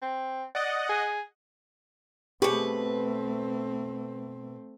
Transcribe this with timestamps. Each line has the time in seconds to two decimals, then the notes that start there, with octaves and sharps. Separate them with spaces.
0.02 C4
0.55 D5 D#5 F#5
0.89 G#4
2.42 B2 A3 C4 G4 G#4 B4 C#6